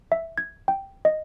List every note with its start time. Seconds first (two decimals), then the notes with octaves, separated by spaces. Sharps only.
0.12 E5
0.38 G#6
0.68 G5
1.05 D#5